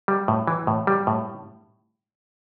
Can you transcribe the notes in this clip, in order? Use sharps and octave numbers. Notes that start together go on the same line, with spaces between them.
G3
A2
E3
A2
G3
A2